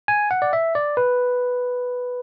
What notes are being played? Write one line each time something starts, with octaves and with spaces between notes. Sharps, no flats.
G#5
F#5
D5
E5
D5
B4